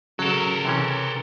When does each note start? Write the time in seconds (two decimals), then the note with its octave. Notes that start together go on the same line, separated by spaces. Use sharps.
0.19 C#3 F#3 A4 A#4
0.65 C3 E3 C#4